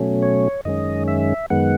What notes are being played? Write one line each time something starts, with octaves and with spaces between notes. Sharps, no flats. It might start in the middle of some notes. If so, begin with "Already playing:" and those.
Already playing: B2 F#3 A3 C#4
C#5
F#2 D#3 G#3 C#4 D#5
E5
F#2 D#3 G#3 B3 F#5